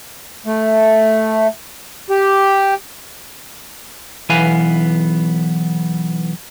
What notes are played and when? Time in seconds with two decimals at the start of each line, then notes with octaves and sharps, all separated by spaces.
0.46 A3
2.10 G4
4.29 B1 E3 B3 B4 F5 G#5